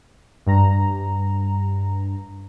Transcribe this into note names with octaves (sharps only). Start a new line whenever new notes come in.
G2 A#5